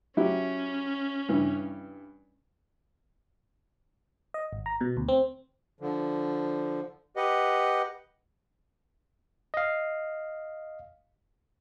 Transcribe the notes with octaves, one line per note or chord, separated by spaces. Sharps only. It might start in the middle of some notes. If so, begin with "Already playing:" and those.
F#3 C#4 E4 G4
G2 E3
D#5
G#1
A#5
B2
D2
C4
D3 F3
G4 B4 D#5 F#5
D#5 F5